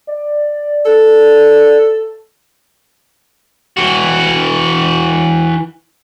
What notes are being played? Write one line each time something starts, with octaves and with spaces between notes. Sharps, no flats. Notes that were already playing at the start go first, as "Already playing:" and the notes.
D5
A4
E3 F#4